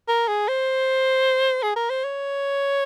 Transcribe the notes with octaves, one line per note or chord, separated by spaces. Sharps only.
A#4
G#4
C5
G#4
A#4
C5
C#5